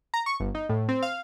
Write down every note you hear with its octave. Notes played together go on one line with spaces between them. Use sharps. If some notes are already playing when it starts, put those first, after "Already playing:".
A#5
C#6
G1
D#4
A2
C4
F5